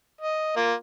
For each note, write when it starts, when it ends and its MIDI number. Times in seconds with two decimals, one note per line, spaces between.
0.21 0.55 75
0.57 0.73 58
0.57 0.73 65